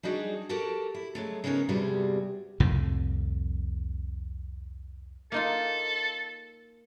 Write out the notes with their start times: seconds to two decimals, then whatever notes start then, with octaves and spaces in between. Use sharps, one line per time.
0.03 G3 D4 D#4 F#4 G#4
0.49 F#4 G4 A4 A#4 A5
0.94 E4
1.15 F#3 G#3 A3
1.44 C#3 G#3 B3 C#4 D#4 A#4
1.69 E2 G2 C3 G3 F#4 G#4
2.60 C2 F2 A2 C3
5.32 A#3 D#4 F4 A4